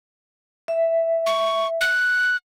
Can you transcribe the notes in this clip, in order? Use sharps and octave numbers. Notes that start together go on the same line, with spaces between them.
E5
C#6
F#6